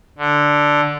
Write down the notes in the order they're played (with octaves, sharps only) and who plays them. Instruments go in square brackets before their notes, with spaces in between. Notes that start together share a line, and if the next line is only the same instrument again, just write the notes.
[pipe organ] D3